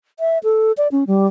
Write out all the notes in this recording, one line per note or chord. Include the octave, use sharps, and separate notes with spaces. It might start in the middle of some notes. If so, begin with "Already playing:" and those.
E5
A4
D5
C#4
G3